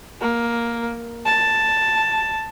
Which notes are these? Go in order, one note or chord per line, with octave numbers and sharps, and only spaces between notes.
A#3
A5